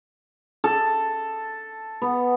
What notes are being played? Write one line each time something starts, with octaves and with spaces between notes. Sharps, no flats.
A4
B3